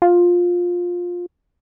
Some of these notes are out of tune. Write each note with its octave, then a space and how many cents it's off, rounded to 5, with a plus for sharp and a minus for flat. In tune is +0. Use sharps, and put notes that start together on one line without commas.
F4 +15